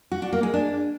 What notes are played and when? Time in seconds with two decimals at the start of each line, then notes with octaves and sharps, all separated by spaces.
0.12 F#4
0.22 D4
0.33 A#3
0.43 G#3
0.54 D4